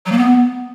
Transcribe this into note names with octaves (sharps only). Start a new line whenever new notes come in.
F#3
A#3
B3